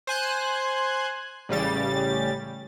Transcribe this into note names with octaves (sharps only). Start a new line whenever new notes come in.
C5 G#5 F#6
A1 C#3 G3 A6